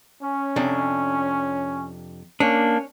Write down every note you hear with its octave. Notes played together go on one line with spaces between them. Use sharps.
C#4
F2 C3 D4
A#3 C#4 D4